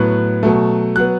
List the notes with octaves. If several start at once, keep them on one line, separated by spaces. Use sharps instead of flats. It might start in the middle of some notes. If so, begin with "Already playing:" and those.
Already playing: A2 F#3 B3 F#6
B2 F#3 A3
F#3 B3 F#6